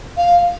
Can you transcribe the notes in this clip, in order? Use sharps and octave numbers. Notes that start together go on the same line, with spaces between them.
F5